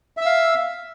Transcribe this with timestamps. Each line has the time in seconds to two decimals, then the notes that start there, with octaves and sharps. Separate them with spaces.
0.17 E5
0.21 E6
0.26 F5